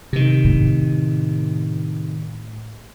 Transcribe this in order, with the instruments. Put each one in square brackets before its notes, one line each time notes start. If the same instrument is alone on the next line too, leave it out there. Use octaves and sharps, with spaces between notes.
[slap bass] C3 D#3
[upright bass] A2